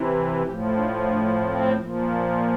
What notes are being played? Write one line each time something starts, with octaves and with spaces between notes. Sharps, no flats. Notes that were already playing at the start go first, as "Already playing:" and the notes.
Already playing: C3 E3
A2 F3 G4
D4
D4
C4
A#2 F3